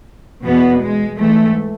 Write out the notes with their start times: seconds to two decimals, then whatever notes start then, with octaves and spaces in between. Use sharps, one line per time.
0.43 E2 B2 B3
0.82 G#3
1.19 G#2 E3 A3